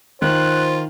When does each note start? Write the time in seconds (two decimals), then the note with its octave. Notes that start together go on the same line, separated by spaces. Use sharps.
0.22 D#3 F4 C5 F#6